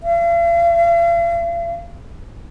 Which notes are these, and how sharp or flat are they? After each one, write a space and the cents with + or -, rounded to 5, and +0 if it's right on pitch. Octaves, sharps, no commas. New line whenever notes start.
F5 -45